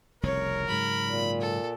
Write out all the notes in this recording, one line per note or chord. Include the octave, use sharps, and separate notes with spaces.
F1 C2 C#3 A#4 C#5
G#2 C#3 F#3 B5
A#2
A4